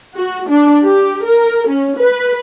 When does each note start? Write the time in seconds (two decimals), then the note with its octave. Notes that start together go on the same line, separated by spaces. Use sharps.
0.16 F#4
0.49 D4
0.84 G4
1.26 A#4
1.69 C#4
1.99 B4